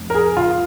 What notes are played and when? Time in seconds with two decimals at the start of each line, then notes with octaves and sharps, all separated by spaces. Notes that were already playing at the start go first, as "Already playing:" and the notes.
Already playing: F1
0.10 A#4
0.15 G#4
0.37 F4